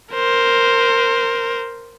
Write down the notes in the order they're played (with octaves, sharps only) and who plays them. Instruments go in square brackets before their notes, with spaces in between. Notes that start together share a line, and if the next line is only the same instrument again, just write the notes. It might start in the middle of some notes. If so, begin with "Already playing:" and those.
[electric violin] A#4 C5